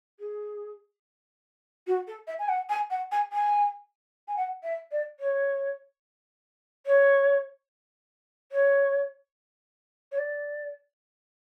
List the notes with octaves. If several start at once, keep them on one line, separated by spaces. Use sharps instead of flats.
G#4
F#4
A4
E5
G#5
F#5
G#5
F#5
G#5
G#5
G#5
F#5
E5
D5
C#5
C#5
C#5
C#5
D5